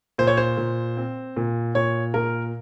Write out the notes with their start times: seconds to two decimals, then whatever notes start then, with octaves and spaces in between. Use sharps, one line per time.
0.18 A#2 C5
0.27 C#5
0.37 C5
0.57 A#2
0.97 C4
1.37 A#2
1.75 A#2 C#5
2.14 A#2 A#4